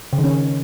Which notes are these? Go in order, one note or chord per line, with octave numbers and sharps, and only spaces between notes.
C#3
D#3
C#4